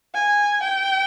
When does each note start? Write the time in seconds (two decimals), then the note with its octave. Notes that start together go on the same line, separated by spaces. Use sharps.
0.14 G#5
0.62 G5